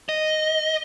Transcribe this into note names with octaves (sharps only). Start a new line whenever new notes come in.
D#5